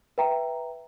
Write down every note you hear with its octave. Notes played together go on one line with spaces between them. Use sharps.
B4 E5 G5 A#5